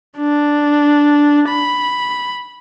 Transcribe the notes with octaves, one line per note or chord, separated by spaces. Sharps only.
D4
B5